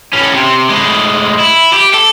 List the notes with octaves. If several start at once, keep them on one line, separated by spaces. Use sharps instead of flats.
A2 C#4
C3
A2 G#3
E4
G4
A4